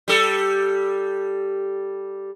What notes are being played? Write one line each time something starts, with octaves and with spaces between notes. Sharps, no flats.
G3 A4